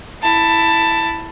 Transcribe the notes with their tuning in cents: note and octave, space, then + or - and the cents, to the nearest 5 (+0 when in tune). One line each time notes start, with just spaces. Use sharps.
E4 +0 A5 +10